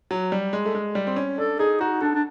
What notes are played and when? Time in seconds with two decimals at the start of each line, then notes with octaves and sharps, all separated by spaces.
0.11 F#3
0.32 G3
0.53 G#3
0.66 A3
0.75 G#3
0.95 G3
1.07 C4
1.16 C#4
1.38 D4 A4
1.59 D#4 G#4
1.80 D#4 F#4
2.01 D4 A4
2.14 D4